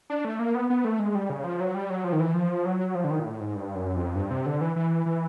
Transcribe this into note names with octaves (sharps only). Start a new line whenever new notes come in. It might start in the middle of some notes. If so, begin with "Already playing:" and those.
D4
A3
A#3
B3
B3
A3
G#3
G3
C#3
F3
F#3
G3
F#3
F3
D#3
E3
F3
F#3
F3
D3
D#3
A#2
A2
G#2
G2
F#2
F2
G2
C3
D3
E3
E3
E3